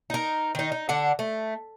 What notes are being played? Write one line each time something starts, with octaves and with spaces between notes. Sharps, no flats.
D#4 A#4
D#3 D#4
D#4
D3 D4 F#5
A3